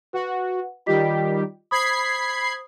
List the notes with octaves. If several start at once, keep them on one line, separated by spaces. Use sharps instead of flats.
F#4 B4 F#5
D#3 G3 F4 G4 D#5 B6
C5 B5 D#6 G#6 C7